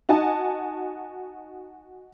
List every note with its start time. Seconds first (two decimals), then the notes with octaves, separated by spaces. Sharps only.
0.09 D#4 F#4 D#5 G#5 A5